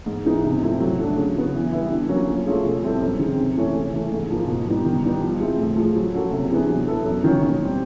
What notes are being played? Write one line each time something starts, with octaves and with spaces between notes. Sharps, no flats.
G#2
E3 G#3 B3 D#4
C3
F3 A3 C4 E4
F#3
A3 D4
C#3
F#3 B3
E3
G3 B3 E4
D3
F#3 A#3 C#4
F3
A3 C#4 F4 G#4
B2
G3 C4 E4 A4
F#2
D#3 G#3 C4
C3
E3 A3 C#4
C#3
E3 A3
G#2
F3 A#3
B2
G3 B3 D#4
D#3
G3 B3 D#4
F3
G#3 C4 E4
A2
F3 G#3
F#3
A#3 C#4 F#4 A4
C3
E3 G#3 B3 D4
F#3
B3 E4 A4
F#2
D#3 F#3 A#3 C#4
B2
G3 C4